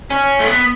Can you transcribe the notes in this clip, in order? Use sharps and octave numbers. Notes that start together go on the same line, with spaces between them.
C#4
A3
B3